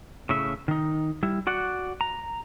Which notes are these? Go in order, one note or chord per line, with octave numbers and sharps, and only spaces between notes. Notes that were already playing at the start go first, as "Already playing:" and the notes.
A2 C#3 E5
D#3 D#4
G3 E4
F#4 D5 F#5
A#5